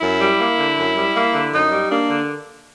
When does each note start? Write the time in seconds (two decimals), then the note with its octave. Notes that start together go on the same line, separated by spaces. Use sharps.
0.01 F#2 E4
0.20 G3
0.39 A#3
0.58 D3
0.77 F#2
0.96 G3
1.15 A#3
1.34 D3
1.53 F#2 D#4
1.71 G3
1.91 A#3 D4
2.10 D3